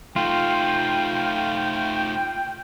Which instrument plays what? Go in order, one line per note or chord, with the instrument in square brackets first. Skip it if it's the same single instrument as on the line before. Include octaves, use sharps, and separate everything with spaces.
[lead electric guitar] A3 D#4 [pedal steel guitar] F4 [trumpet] G5